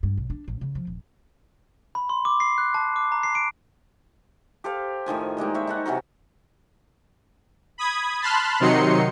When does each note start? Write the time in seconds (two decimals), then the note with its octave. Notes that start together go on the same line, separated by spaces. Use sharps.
0.03 G2
0.17 B1
0.30 D4
0.48 A1
0.61 C#3
0.75 F3
0.87 D#1
1.95 B5
2.09 C6
2.25 D6
2.40 C7
2.58 F#6
2.74 A5
2.96 D6
3.12 A#5
3.23 C7
3.35 D7
4.64 G4 A4 C5 F5
5.06 A2 D#3 F3 G#5
5.37 G3 G#3 A#3 D#4
5.54 C5 C#5 E5
5.67 D#4 A4 F#5
5.86 C3 E3 F#3 A#4
7.78 B5 D#6 G#6
8.21 A5 B5 C6 F6 F#6
8.60 C3 D#3 F#3 D#4 C6 C#7